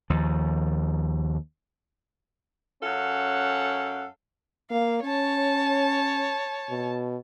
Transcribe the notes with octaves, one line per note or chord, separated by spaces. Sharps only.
D#2 F3
F#2 C#4 A4 F5 F#5
A#3 F5
C#4 C#5 A5
B2